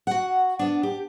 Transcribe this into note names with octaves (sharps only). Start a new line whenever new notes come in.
F#4 F#5
B3 D4
G4